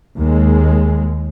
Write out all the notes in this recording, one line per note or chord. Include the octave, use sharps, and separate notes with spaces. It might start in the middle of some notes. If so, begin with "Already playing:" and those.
D#2 G#3